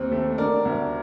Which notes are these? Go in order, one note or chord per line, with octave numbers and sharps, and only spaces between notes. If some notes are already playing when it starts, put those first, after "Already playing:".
Already playing: D#2 C4
A3
D3 A#4 D5
D2